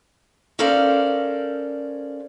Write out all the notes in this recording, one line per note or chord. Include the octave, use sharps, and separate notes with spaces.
C#4 A4 A#4 C5 D5 F5